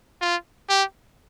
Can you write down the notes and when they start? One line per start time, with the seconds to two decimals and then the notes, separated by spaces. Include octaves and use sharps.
0.21 F4
0.69 G4